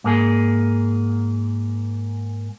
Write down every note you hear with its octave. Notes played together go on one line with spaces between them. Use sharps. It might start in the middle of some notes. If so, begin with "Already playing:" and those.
G#2 A#3 G#4